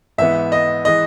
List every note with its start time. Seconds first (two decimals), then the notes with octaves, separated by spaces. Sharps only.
0.18 G#2 E3 B3 E5
0.52 D#5
0.85 E3 G#3 D#5